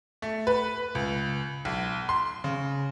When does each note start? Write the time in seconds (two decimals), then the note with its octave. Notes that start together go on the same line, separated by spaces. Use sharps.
0.22 A3
0.47 B4
0.95 C#2
1.65 B1
2.09 C6
2.44 C#3